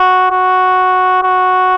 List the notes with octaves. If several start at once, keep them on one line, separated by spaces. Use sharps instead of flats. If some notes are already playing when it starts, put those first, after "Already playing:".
Already playing: F#4
F#4
F#4